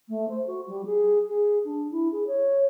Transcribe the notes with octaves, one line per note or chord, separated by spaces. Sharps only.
A3
C5
F#4
G3
G#4
G#4
D4
E4
G#4
C#5